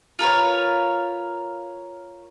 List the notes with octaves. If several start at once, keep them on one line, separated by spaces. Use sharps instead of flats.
F4 A#4 B4 C#5